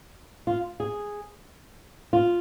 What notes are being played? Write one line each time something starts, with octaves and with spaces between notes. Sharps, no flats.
F4
G#4
F4